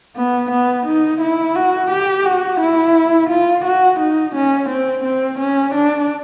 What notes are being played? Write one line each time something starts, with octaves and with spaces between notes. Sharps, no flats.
B3
B3
D#4
E4
F#4
G4
F#4
E4
F4
F#4
D#4
C#4
C4
C4
C#4
D4